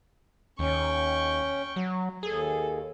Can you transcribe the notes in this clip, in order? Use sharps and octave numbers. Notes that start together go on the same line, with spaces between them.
D#2 C#4 G5 C#6
F#3
D#2 G#4 A4